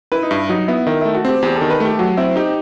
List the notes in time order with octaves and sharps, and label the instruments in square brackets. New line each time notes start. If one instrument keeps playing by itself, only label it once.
[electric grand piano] E4 [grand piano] B4
[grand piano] D#4
[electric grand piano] G2 [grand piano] E4
[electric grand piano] F#3 [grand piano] D#4
[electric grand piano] B3 [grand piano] E4
[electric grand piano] D#3 [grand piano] E4
[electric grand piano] A3 [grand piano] E4
[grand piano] F#4
[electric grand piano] C4 [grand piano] G4
[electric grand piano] E2 [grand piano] G4
[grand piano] A4
[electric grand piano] D#3
[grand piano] B4
[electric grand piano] A3 [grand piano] G4
[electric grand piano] F#3 [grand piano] F#4
[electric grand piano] C4 [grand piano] E4
[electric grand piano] D#4 [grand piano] G4